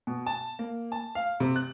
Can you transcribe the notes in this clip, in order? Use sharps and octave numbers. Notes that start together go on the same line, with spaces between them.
B2
A5
A#3
A5
F5
C3
F#6